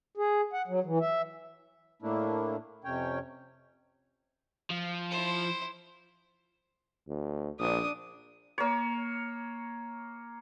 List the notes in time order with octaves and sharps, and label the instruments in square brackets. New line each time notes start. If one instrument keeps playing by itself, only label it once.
[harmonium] G#4
F#5
F#3
E3
E5
A2 A3 A#3 D4 E4
F2 C3 C#4 C#5 G5
[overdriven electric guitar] F3
[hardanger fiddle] E4 C5
[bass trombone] D2
[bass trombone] A#1 [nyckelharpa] D4 D#6
[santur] A#3 C#5